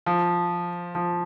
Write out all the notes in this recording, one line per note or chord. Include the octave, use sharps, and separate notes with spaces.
F3
F3